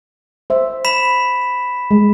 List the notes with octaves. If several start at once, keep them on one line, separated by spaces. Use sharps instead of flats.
C5 E5
B5 B6 E7
G#3